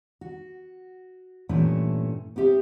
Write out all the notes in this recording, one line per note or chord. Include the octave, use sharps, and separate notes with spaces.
F#4
G2 A#2 E3 A3 C#4
B3 C4 G4 E5